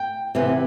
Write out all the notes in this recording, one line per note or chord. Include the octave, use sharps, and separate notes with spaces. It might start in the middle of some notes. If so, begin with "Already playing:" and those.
Already playing: G5
C3 E3 B3